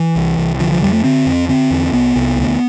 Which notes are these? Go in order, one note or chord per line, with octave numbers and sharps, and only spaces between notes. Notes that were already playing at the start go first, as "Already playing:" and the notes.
Already playing: E3
C2
C2
D3 F3
F3
F2 G3
A3
D3 C4
F2
D3 C4
E2
C2 B3
C2
D2